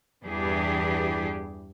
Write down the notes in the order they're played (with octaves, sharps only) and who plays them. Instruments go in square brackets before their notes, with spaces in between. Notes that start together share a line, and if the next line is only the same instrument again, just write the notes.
[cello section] E2 G2 E3 D4 G4 G#4